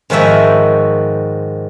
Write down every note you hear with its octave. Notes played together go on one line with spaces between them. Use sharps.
G#2 D#3 F3 F#4 E5